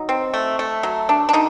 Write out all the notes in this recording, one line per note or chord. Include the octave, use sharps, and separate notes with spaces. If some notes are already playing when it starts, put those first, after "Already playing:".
Already playing: F#3 D#4
C4
A3
A3
F#3
D4
D4
D3 D#4